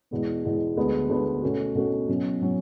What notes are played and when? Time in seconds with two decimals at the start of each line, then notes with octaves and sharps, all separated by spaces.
0.11 E2 B2 G#3 B3
0.44 E2 B2 G#3 B3
0.77 D2 D3 G#3 B3 D4
1.09 D2 D3 G#3 B3 D4
1.42 B2 A3 C#4 F#4
1.75 B2 A3 C#4 F#4
2.09 B2 F#3 C#4
2.42 B2 F#3 C#4